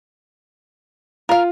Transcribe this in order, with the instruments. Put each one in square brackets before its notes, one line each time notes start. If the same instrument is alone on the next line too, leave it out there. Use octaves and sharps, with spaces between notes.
[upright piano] F4 [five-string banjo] A#4 F5